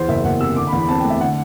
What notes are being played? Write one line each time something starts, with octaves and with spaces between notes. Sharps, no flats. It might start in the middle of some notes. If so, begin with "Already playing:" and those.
Already playing: E2 C5
F#1 E5
F#1 F#5
C3 E6
D3 D6
B5
E2
B5
C4 A5
G5
A3
E5
D3 F#5